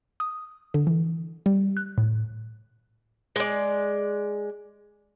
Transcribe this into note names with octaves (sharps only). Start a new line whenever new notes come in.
D#6
D3
E3
G3
F#6
A2
G#3 D5